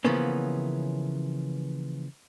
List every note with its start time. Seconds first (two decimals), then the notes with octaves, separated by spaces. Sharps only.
0.05 C#3 E3 F3 A#3 B3 C#4